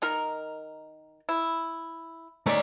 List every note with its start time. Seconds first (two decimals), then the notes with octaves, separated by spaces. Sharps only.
0.02 D#3 D#4 A#4
1.29 E4
2.46 A3 C#4 D#4 D5